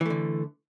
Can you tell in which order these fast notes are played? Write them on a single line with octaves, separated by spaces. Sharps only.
E3 A3 D3